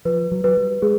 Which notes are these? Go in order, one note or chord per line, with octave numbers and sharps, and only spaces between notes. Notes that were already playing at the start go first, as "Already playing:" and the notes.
F3 B4
F#3
F#3 B4
G3
G#3 G#4